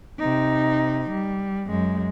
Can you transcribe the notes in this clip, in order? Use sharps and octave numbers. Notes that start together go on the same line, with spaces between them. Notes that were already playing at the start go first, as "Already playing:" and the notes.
C3 D#4
G3
F#2 G#3